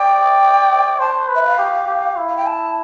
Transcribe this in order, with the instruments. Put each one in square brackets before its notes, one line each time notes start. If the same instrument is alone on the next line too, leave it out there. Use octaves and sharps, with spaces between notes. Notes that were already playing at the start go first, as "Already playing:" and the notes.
Already playing: [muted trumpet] D5 [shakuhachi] G5
[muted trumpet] C5 [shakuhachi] A5
[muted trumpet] B4
[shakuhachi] E5
F5
[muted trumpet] G4
G4
E4
[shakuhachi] F5
G5
A5